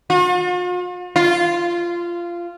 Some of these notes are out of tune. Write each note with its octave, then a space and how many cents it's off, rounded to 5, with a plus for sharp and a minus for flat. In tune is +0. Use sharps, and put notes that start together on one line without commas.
F4 +45
F4 -15